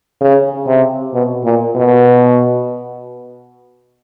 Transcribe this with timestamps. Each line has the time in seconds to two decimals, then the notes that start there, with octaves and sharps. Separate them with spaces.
0.21 C#3
0.67 C3
1.14 B2
1.45 A#2
1.76 B2